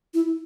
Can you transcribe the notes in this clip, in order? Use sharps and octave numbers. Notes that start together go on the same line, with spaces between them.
E4